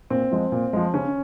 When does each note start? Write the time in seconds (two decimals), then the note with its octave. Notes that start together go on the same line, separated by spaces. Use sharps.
0.10 A#2 C4
0.32 F3 G#3
0.52 A#2
0.73 F3 G#3
0.94 C#3 C#4